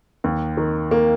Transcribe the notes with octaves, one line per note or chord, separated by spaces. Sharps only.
D#2
D#3
A#3